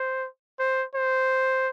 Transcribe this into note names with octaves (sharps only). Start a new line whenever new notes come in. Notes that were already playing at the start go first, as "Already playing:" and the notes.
Already playing: C5
C5
C5